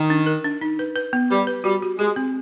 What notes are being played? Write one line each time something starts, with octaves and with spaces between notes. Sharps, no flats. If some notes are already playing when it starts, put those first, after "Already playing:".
Already playing: D#3
D4
A#4
D4
D#4
B4
B4
B3
G3 B4
B4
G3 F#4
F#4
G#3 G4
C4